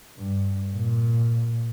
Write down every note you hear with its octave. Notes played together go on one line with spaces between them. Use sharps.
G2
A#2